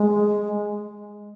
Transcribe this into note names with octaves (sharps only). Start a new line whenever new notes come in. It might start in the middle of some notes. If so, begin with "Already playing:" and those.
Already playing: G#3